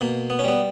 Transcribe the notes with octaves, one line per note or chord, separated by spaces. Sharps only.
B2 A#3
B3
C#4
G3 B3